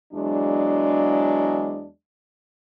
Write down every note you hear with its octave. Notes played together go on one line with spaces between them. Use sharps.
E2 F#3 G#3 D4